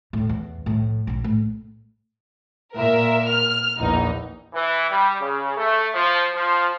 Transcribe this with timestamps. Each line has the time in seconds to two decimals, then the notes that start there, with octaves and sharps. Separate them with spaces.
0.13 D2 A2
0.29 E2
0.66 A2 F3
1.07 A#1 D4
1.24 A2
2.75 A#2 A#4 E5
3.27 F6
3.78 A#1 E2 D#4
4.54 E3
4.90 G3
5.21 C#3
5.58 A3
5.95 F3
6.35 F3